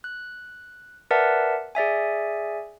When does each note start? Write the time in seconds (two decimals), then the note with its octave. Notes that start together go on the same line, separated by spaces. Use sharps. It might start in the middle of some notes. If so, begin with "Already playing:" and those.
0.04 F#6
1.11 A#4 B4 D5 E5 F#5 A5
1.75 G#4 D5 E5 G#5